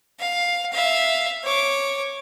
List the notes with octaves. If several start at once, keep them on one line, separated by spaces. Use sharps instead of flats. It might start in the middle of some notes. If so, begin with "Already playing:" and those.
F5
E5 F5
C#5 D6